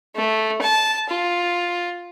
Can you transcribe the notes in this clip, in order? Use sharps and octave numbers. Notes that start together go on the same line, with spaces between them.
A3
A5
F4